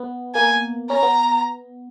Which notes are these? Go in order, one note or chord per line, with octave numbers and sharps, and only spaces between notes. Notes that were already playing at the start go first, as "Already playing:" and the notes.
Already playing: B3
A#3 G#5
C#4 A#5
B3